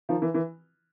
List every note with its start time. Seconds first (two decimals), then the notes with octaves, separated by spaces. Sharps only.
0.09 D#3 F3
0.22 E3
0.34 E3